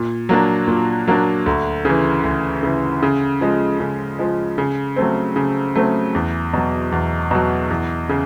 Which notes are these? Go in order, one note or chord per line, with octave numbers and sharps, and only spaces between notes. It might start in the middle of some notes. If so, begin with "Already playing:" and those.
Already playing: A#2
F#3 A#3 D4
A#2
F#3 A#3 D4
D2
C#3 E3
D2
C#3 E3
C#3
F3 G#3
C#3
F3 G#3
C#3
F#3 A3 C4
C#3
F#3 A3 C4
E2
B2 F#3
E2
B2 F#3
E2
C#3